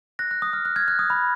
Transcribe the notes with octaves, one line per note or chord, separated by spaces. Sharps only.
F#6 A#6
F#6
D#6
F6
F#6
F6 G#6
F#6
D#6
B5